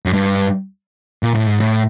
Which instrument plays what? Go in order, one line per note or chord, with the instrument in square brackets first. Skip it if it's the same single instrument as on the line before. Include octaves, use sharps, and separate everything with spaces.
[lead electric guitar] F#2
G2
A#2
A2
G#2
A2